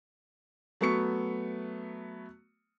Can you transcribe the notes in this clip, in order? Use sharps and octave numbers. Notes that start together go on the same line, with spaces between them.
F#3 A3 B3 C#6 C#7